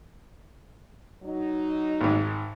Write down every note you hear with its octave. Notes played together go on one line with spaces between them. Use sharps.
F#3 D#4
G#1 G#2